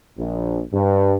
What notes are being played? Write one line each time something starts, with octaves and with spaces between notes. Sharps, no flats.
A#1
G2